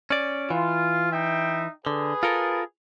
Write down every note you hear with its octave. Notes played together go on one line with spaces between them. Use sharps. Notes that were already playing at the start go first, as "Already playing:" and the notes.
C#4 D5
E3 F4
D#4 E5 G5
D3 G#4 B4
F4 A4 A#4